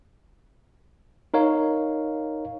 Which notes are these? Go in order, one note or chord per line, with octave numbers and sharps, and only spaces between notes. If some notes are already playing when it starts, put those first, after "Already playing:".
D#4 A#4 C#5 F5